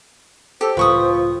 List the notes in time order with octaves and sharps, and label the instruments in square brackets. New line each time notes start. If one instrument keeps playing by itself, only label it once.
[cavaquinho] G4 [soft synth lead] A4 [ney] C5
[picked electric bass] C#2 A2 E3 [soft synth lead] F4 [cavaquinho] B4 C#6 D#6